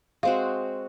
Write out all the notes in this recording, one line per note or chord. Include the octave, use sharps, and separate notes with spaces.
G#3 C4 F#4 F5